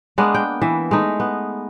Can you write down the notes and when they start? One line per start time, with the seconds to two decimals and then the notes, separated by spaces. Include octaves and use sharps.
0.18 G#3 A#3 B3 D4
0.34 G5
0.62 E3 E5
0.91 G#3 A3 D#4
1.20 B3